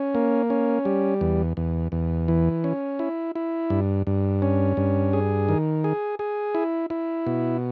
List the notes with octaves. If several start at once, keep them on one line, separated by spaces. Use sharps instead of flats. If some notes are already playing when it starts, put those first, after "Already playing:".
Already playing: C#4
A#3
C#4
G3
E2
E2
E2
E3
C#4
E4
E4
G2
G2
C#4
G2
G#4
D#3
G#4
G#4
E4
E4
B2